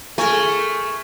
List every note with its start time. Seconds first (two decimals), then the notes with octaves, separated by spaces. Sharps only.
0.18 A3 G#4 A#4 G#5 C#6